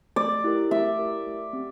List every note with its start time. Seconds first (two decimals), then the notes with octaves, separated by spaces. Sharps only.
0.16 A3 D5
0.44 E4 G4 A#4
0.71 A3 E5
0.99 E4 G4 A#4
1.26 A3
1.53 C4 G4